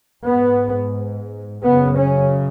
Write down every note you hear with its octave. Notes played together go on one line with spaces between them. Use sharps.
G#2 B3
F#2 C#3 B3
C#4